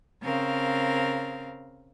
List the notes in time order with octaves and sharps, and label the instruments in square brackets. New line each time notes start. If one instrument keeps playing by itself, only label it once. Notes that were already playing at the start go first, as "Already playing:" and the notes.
[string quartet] C#3 C4 A#4 F5